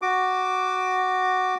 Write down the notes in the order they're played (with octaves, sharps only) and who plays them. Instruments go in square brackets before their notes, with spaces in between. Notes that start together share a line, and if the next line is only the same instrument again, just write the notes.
[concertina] F#4 D6